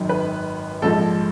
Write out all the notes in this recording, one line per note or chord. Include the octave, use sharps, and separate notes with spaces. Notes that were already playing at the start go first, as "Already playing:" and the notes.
Already playing: G#1 F#2 D#3 F#3
B4
A#1 G#2 F3 A4